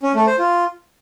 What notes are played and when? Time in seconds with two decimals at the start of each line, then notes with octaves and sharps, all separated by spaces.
0.03 C#4
0.15 A3
0.27 C5
0.38 F4